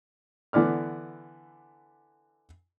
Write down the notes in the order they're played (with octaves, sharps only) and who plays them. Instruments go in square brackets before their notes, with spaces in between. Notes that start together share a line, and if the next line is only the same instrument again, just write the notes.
[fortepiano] D3 E3 B3 D5 F6